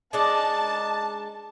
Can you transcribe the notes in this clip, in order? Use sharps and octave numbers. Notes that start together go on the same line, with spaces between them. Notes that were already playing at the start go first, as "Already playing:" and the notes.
G#3 D4 D#4 A5